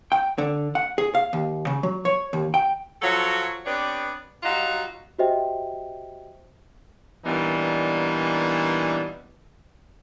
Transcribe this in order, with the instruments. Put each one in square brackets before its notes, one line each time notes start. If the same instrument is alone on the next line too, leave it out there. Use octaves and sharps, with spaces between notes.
[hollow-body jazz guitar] G5
D3
F#5
G#4
F5
D#2
C#3
F#3
C#5
D#2
G5
[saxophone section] F3 F#3 F#4 A4 C#5 F5
B3 C4 D4 G4 B4 C#5
F#3 G3 D#4 F4 F#4 F5
[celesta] F#4 G4 C5 D#5 E5 G5
[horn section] A#2 E3 G3 B3 D4 D#4